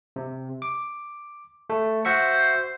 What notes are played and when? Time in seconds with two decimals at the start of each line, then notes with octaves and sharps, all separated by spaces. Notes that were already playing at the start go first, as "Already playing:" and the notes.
0.16 C3
0.62 D6
1.70 A3
2.05 F#4 C5 E5 C#7